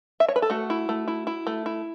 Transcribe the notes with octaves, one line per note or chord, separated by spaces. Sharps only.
E5
C#5
B4
A4
A3 F#4
E4
A3
E4
E4
A3
E4